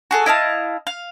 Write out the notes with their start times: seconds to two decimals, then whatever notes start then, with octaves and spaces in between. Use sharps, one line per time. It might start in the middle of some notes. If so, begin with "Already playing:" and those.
0.11 F#4 G#4 A4
0.26 E4 D#5 F5 A5
0.87 F5